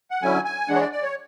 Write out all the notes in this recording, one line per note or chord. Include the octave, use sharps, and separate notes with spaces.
F#5
D3 F#3 C#4 E4 G#5
G#5
E3 G#3 D4 F#5
C#5
D5
D5
C#5